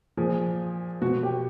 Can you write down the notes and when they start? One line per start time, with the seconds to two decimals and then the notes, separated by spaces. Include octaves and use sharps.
0.17 A#2 F3 G#4
1.02 B2 F#4
1.23 G4